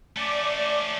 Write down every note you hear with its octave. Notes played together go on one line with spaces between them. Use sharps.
A3 C#4 D5